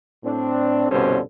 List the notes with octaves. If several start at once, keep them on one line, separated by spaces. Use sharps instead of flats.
A2 C4 D4
C2 G2 B2 D3 C#4 C5